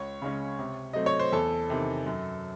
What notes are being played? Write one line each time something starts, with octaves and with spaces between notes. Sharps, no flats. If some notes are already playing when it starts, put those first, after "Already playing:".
Already playing: C#2 C#5
C#3 G#3 C#4
C3
F#3 A3 C4 D#5
C#5
C5
E2 A4
C3 D#3
F#2